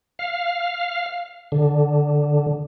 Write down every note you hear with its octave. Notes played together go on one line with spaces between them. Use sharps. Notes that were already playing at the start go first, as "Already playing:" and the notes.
F5
D3